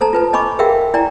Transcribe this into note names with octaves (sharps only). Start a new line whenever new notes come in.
A4 C5 A5 A#5
F4 B4 A5
D#5 G#5 B5 C#6 D6
G4 G#4 A#4 E5 F5 G5
E4 D5 G5 G#5 A#5